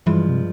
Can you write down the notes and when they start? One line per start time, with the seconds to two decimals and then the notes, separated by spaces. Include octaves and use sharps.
0.06 G2 E3 F3 G#3
0.29 C3